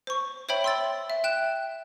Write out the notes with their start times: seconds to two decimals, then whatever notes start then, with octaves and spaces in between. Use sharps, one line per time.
0.07 C5 C#6
0.49 C5 C#5 E5 G5 B5
0.64 C6 E6 A6
1.10 E5
1.24 G5 F#6 E7